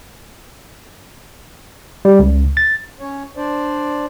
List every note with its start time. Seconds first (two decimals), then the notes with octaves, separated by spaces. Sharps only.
2.05 G3
2.19 C#2
2.57 A6
3.00 C#4 C#5
3.36 D4 C5 D5